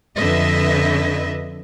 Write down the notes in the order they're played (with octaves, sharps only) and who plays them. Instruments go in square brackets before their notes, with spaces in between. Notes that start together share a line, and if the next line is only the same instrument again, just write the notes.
[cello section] F2 D3 B4 D#5 E5